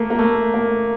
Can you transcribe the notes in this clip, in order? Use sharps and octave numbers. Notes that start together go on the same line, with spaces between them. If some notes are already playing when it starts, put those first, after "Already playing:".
Already playing: A3 A#3
A#3
A3
A#3